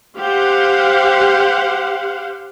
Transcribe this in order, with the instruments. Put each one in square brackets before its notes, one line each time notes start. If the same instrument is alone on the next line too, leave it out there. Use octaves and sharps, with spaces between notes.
[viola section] G4 C5 F5 F#5